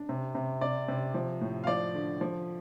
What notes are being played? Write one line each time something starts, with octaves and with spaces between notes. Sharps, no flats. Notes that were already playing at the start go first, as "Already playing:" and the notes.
Already playing: D4
C3
C3
C3 D5
C3
F3
A2
F5
F3 D5
D3
F3